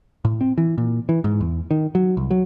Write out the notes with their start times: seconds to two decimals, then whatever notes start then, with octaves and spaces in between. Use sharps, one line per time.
0.25 A2
0.41 C4
0.58 E3
0.78 A#2
1.09 E3
1.24 G#2
1.41 E2
1.71 D#3
1.95 F#3
2.17 C2
2.31 F#3